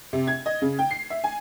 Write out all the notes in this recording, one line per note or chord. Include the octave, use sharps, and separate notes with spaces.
C3
G#6
D#5
C#3
G5
C7
E5
G#5